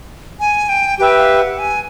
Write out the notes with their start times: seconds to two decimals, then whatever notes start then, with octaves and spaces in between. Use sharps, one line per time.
0.40 G#5
0.69 G5
0.99 G4 B4 E5 G5
1.19 F5
1.39 F#5
1.59 G#5